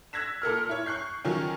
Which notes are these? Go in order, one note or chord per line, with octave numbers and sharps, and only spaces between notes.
E6 F#6 G#6 A#6 B6 E7
A#2 A4 A#4 F6
E4 C#5
C#6 F#6 G6 C7
D#3 F3 F#3 C#4